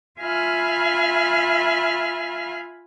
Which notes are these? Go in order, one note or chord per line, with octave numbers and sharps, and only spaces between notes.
F4 E5 F5 G#5 B5 F6